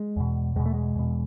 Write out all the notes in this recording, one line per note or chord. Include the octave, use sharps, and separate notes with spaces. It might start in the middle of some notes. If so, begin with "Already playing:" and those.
Already playing: G#3
E2 B2
E2 B2 G#3
A3
G#3
E2 B2